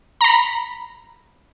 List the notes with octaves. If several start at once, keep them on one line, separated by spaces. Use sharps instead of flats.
A#5 B5